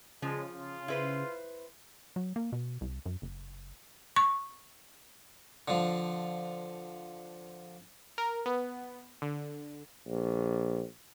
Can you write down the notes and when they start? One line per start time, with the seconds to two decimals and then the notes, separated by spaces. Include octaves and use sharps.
0.22 C#3 F3 G#3
0.53 F4
0.88 E4 B4 C5
2.16 F#3
2.36 A#3
2.52 B2
2.81 C2
3.06 F#2
3.22 F#1
4.16 C#6
5.68 D3 F3
8.18 A#4
8.46 B3
9.22 D3
10.07 A#1